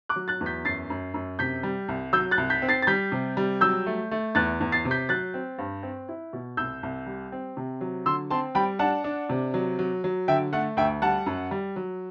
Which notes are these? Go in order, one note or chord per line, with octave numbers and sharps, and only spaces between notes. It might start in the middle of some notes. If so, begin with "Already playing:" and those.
D6 F#6
F#3
F#6 A6
E2
G6 B6
F#2 A6 C7
F#2
F#2
C3 G6 B6
G3
C2
F#3 E6 G6
F#6 A6
C2
G6 B6
C4
A6 C7
A6
G3 G6 B6
C3
G3
F#3 E6 G6
A3
A3
E2 F#6 A6
E2
A6 C7
C3
G6 B6
F#3 F#6 A6
C4
G2
C4
E4
B2
C2 E6 G6
C2
G3
C4
C3
F#3
D3 C6 E6
C4 A5 C6
G3 G5 B5
D4 F#5 A5
D4
C3
F#3
F#3
F#3
D3 E5 G5
A3 F#5
D2 E5 G5
G3 F#5 A5
F#2
G3
F#3